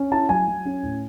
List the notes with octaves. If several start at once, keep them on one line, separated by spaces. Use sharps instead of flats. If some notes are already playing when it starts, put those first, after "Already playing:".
Already playing: C#4
E4 A5
F#3 G#5
F#3
C#4
A2